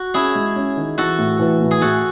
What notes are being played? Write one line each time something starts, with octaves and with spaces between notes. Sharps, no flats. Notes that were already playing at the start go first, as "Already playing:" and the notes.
Already playing: F#4
C#4 E4 G#4
G#3
C#4
D#3
E3 F#4 A4
A2
E3
A2
G#4
A2 F#4 A4